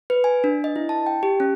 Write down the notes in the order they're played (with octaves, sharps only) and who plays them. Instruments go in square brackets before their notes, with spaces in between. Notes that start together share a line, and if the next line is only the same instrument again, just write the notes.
[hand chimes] B4
G#5
D4
D#5
E4
A5
G5
G4
C#4